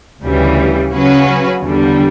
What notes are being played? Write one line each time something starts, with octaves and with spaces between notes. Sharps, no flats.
D2 C#3 E3 G3
C#3 F#3 C#4 F#4 B4
E2 D3 G3